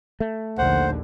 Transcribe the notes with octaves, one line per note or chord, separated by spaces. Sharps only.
A3
A#1 D#2 D3 C5 F#5